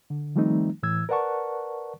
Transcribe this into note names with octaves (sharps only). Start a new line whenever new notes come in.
D3
D#3 F3 G3 A3 C4 D#4
A2 E3 E6 G#6
A#4 B4 D5 F#5 A5 C#6